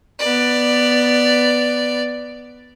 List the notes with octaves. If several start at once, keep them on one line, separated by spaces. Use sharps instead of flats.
B3 D5